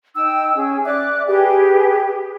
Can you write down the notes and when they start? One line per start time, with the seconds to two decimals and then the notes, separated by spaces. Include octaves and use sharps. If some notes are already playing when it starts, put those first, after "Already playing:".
0.15 D#4 G5 E6
0.55 C#4 G#4
0.84 D5 E5 D6 F#6
1.27 G4 G#4 B4 G5